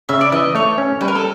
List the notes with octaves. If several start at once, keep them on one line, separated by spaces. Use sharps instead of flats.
C#3 E5
D5
E3 D#5
A3 C#5
C#4
G3 B4
A#4
A4